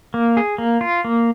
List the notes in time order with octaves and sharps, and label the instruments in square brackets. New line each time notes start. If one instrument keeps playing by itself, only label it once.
[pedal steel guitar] A#3
G#4
A#3
F4
A#3